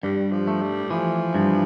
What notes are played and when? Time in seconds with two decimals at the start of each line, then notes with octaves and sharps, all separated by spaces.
0.03 G2 G3
0.32 F3
0.47 A3
0.62 G3
0.91 E3 F3
1.35 G2